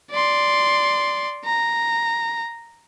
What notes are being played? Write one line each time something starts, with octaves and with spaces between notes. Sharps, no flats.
D5 C6
A#5